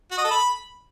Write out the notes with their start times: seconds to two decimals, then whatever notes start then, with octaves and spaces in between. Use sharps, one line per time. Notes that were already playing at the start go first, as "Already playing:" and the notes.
0.11 F#4
0.18 D#5
0.24 A4
0.31 B5